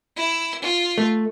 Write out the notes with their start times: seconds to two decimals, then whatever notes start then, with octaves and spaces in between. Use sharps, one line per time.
0.17 E4 E6
0.62 F4
0.98 A3